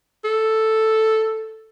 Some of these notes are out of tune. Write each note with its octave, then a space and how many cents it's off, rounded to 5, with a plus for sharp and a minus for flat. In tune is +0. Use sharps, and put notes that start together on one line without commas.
A4 +0